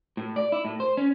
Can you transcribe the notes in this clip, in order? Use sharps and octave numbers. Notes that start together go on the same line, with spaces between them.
A2
D5
E4
A2
C5
C#4